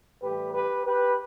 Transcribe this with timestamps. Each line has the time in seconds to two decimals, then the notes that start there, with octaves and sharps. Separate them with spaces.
0.23 A2 E3 G3 G4 B4
0.54 G4 B4
0.86 G4 B4